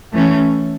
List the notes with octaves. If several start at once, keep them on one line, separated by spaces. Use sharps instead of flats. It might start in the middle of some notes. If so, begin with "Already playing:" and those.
E3 A3 C#4